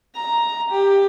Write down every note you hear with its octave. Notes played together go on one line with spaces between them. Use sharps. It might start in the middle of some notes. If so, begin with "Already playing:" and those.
A#5
G4